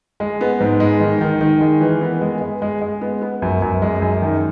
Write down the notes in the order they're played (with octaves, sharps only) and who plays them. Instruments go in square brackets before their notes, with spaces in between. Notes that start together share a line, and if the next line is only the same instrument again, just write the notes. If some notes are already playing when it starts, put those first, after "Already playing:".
[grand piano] G#3
B3
G#2
G#3
D#3
D#3
D#3
G#3
E3
B3
G#3
G#3
G#3
G#3
B3
B3
F#2
F#2
G#3
F#2
D#3